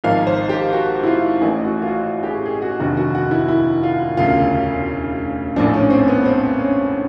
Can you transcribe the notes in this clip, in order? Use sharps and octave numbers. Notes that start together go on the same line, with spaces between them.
G#1 G#2 F3 F5
C5
G4
F#4
E4
F4
A1 A2 E3 E4
F#4
F4
F#4
G4
G#4
G#4
F#4
F1 D#2 D3 F3 F#4
F#4
F#4
E4
E4
F4
E1 D2 C#3 F4
A#1 A2 F3 D4
C#4
C4
B3
C4
C#4